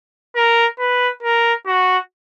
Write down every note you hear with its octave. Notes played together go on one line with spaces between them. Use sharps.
A#4
B4
A#4
F#4